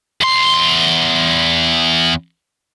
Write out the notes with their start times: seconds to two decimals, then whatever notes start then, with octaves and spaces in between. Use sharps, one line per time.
0.21 E2 C6